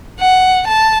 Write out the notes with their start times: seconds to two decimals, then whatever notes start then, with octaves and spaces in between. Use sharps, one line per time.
0.20 F#5
0.67 A5